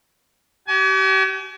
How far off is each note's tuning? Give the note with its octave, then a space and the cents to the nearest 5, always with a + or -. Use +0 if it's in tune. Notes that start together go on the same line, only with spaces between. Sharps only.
G4 -40 G#5 +30